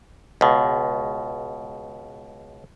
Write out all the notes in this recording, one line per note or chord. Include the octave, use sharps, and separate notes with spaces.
C#2 B2